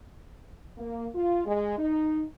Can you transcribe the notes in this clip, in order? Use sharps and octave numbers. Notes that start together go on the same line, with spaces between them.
A#3
F4
G#3
D#4